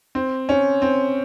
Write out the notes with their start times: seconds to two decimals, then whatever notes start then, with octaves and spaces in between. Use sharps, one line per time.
0.15 C4
0.49 C#4
0.82 C4